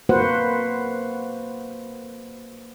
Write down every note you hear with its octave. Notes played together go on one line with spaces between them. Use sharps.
A#3 F#4 B4 C5 F#5